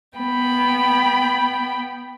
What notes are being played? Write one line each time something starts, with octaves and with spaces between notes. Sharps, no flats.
B3 G5 B5